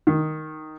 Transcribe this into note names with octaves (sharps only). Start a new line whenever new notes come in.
D#3